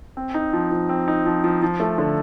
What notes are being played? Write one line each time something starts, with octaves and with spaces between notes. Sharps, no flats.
C4
D#4
F3
F3
C4
D#4
F3
F3
F3
A3
D3